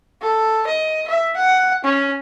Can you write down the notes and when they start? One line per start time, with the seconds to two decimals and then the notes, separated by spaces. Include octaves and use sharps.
0.22 A4
0.67 D#5
1.08 E5
1.37 F#5
1.84 C#4